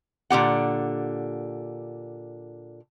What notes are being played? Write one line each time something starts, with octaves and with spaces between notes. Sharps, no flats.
A#2 D3 G4 F#5